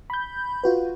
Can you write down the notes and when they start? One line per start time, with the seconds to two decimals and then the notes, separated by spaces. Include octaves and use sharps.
0.10 B5 G6
0.64 F4 F#4 B4